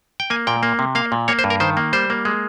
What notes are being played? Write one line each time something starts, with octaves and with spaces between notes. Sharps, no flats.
G5
A#3 G#5
A#2 G5
A#3
C3
A#3 F5
A#2
A#3 C#5
C5
G2
A#4
D#3 C5
A#3
G3 C5
A#3
G#3